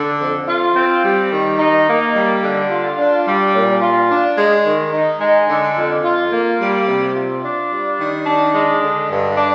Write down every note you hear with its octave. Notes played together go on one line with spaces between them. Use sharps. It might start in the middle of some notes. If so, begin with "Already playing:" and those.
Already playing: D3
F2
F4
C4
G3
D#3
D#4
A#3
G3
D3
F4
D4
G3
A#2
F4
D4
G#3
D#3
D#4
G#3
D3
F2
F4
A#3
G3
C3
F4
D4
G3
D#3
D4
G#3
D3
G2
D4